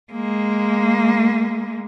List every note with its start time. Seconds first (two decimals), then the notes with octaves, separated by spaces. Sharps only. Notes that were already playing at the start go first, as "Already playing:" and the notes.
0.13 G#3 A#3